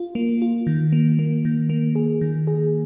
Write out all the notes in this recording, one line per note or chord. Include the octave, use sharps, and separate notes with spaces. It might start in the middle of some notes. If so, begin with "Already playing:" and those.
Already playing: F4
A#3
F4
D#3
A#3
A#3
D#3
A#3
G#4
D#3
G#4